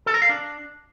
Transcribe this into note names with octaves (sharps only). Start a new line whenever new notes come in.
A4
A#4
F5
D4